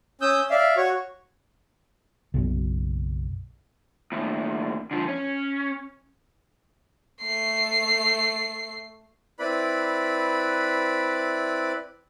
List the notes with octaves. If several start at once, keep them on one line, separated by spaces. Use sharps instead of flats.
C#4 D#6 E6 G6
D5 E5 F5
F#4 C#5 C#6
F#1 B1
D#2 A2
D3 F3
C#4
A3 C7
C4 E4 B4 D5 B5